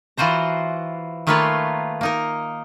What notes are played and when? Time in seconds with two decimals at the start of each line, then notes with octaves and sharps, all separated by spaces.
0.17 E3 F4 F#4 C5 A#5
1.27 D#3 A3 A#3 F4 B4 C#5
2.01 A#3 D#4 A#4